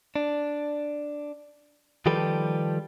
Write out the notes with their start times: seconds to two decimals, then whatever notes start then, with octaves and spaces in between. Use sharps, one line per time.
0.16 D4
2.06 D#3 F3 G3 G4 A4 B4